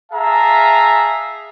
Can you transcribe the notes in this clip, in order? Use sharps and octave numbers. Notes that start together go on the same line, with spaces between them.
G#4 E5 F5 A5 A#5